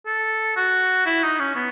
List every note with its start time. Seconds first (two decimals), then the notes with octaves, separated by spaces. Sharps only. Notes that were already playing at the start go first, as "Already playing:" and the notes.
0.07 A4
0.56 F#4
1.06 E4
1.23 D#4
1.40 C#4
1.56 B3